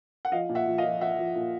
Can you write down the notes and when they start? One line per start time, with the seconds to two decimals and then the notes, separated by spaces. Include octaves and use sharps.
0.25 F#5
0.32 F3 D#5 F5
0.49 A#2
0.55 E5 F#5
0.67 F3
0.78 D#5 F5
0.84 F3
1.01 F3 E5 F#5
1.19 F3
1.35 A#2